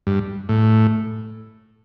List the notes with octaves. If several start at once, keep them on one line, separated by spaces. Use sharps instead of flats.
G2
A2